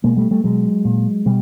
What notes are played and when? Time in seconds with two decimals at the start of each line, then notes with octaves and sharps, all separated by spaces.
0.04 B2 G#3 A#3
0.17 G3 A3
0.31 G3 A3
0.44 B2 F#3 G#3
0.85 A#2
1.26 B2 G3